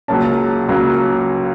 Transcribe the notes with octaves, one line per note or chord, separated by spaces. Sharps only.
C#2 C#3 F#3 A#3 C#4 A5
C#2 C#3 F#3 A#3 C#4